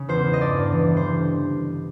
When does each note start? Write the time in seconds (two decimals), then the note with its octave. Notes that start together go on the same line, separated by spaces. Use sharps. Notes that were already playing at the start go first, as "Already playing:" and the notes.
Already playing: C#3
0.08 E2 C5
0.24 E2
0.33 D#5
0.40 G2 D5
0.57 G2
0.72 E3
0.89 D2
0.97 C5